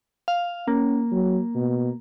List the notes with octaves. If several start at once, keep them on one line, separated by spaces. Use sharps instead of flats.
F5
A#3 C#4
F#3
B2